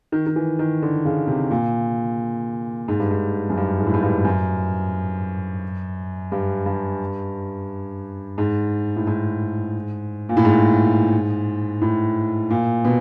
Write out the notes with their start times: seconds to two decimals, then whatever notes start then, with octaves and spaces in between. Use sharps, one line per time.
0.12 D#3
0.26 D#3
0.36 E3
0.59 D#3
0.82 D3
1.05 C#3
1.27 C3
1.51 A#2
2.88 G#2
3.00 G2
3.11 G#2
3.50 F#2
3.57 G2
3.80 G#2
3.87 A2
3.94 G#2
4.03 G2
4.25 F#2
6.32 G2
6.66 G2
8.38 G#2
8.96 A2
9.07 G#2
10.29 A#2
10.37 A2
10.45 G#2
11.82 A2
12.51 A#2
12.85 B2